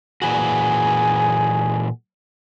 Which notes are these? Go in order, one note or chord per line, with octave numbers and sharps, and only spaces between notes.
A#2 E3 F#4 G#4